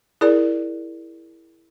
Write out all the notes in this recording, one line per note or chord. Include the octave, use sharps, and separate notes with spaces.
E4 G#4 A#4 D5